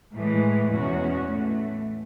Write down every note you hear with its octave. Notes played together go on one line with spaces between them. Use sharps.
A2 E3 G#3
E2 B2 G#3 C#4 F#4
A2 E3 A3